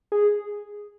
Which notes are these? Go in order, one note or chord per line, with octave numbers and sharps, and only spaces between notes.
G#4